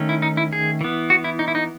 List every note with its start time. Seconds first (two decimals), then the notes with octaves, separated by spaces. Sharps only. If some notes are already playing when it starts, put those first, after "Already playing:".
Already playing: D#3 A3 C#4
0.09 E4
0.22 D#4
0.37 E4
0.53 G#4
0.81 E3 B3
1.10 F#4
1.24 E4
1.39 D#4
1.48 E4
1.55 D#4